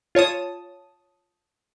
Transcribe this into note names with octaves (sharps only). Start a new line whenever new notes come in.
F4 C#5 A5 D#6